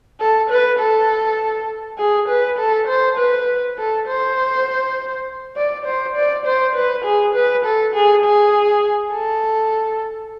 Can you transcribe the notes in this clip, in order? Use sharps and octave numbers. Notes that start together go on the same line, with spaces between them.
A4
B4
A4
G#4
B4
A4
C5
B4
A4
C5
D5
C5
D5
C5
B4
G#4
B4
A4
G#4
G#4
A4